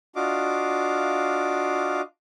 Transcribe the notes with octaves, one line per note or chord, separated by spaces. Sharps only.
D4 F4 F#4 D#5 F5 D6